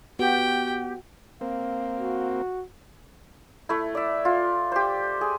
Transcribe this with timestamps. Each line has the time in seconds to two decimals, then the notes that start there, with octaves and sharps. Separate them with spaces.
0.19 B3 F#4 G4 G5
1.41 A#3 C4 F5
1.99 F#4
3.69 A3 E4
3.95 D5 E5
4.25 F4
4.72 G4 C5
5.21 G#4